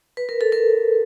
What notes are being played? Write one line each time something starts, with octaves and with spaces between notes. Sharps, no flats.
B4
A#4
A4
A#4